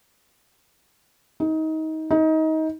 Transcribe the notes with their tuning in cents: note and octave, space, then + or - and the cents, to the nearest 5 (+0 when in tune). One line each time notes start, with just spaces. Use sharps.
D#4 +25
D#4 +25